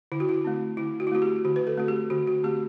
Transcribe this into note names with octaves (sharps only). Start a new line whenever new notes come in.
D3 E4
F#4
E4
A3 C4
D3 E4
F#4
E4
A3 C4 F#4
G4
D3 F#4
B4
A4
A3 C4 F#4
G4
D3 F#4
F#4
A3 C4 G4